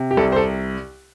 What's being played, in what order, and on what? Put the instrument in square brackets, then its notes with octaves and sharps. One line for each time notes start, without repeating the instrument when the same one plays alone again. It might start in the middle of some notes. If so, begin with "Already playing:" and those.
Already playing: [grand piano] C3
G4
C2 A4
C5
A4